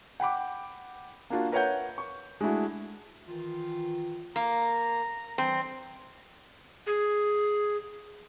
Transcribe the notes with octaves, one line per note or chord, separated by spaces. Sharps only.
F#5 G5 B5 D6
A#3 D4 F4 F#4
A#4 B4 C#5 E5 F#5 G6
C#6
G#3 A3 D4 E4 F#4
D#3 E3 F4
A#3 A#5
E3 G3 C4
G#4